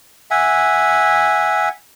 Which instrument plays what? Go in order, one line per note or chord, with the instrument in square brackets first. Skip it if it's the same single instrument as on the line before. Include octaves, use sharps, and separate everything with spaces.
[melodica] E5 F#5 G#5